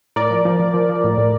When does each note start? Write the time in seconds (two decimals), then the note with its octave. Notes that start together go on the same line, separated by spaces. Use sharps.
0.16 A2 A#4 D5
0.31 F3
0.45 F3
0.60 F3
0.74 F3
0.89 F3
1.04 A2
1.18 A2